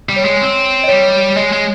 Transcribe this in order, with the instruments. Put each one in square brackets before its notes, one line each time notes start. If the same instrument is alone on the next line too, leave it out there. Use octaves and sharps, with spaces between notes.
[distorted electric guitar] G3
[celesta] C#5
[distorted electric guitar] G#3
C4
[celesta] D#5
[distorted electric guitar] G3 [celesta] C#5
[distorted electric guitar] G#3 [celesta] D#5
[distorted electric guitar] G#3